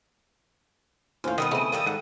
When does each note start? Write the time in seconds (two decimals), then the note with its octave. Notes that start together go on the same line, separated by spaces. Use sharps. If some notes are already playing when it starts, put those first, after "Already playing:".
1.24 D#2 A2 C#4 F4 C5 F5 C6
1.38 D3 D#3 G3 B3 D#6
1.51 C#3 A3 B3 C4 E4 G#4 A4 D#5
1.72 D#3 G3 A4 F5 G5
1.87 G#2 F#5